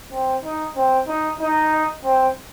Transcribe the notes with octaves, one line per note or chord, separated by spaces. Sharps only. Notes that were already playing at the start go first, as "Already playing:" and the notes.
C4
D#4
C4
D#4
D#4
C4